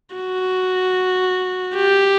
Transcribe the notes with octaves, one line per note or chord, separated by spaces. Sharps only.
F#4
G4